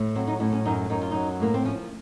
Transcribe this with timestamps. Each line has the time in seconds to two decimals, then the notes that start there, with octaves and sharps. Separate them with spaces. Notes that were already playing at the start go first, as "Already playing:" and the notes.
Already playing: A2
0.16 F#3 C4
0.27 D#4
0.40 A2 C#4
0.52 C#4
0.65 F#2 D#4
0.90 F#2 D#4
1.02 F4
1.11 F#3 D#4
1.40 A2 A#3
1.54 C4
1.65 F3 C#4